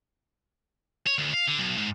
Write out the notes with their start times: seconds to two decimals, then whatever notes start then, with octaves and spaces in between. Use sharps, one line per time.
1.07 C#5
1.18 D2
1.33 F5
1.47 D3
1.59 B1
1.77 G#2